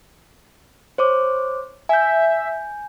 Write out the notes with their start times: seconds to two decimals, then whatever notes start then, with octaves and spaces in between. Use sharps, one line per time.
0.98 C5 C#5 D6
1.89 E5 G#5 G6